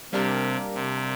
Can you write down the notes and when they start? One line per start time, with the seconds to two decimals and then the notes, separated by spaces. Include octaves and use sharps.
0.13 C3 G3 A#3 D4 G4 A#4
0.75 C3